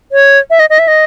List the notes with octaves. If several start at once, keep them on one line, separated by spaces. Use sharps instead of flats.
C#5
E5
D#5
D#5
E5
D#5